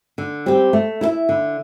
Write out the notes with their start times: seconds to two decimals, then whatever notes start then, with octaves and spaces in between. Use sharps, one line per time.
0.18 D3
0.46 G3 C4 G4
0.73 A3
1.01 E4 A4 E5
1.29 D3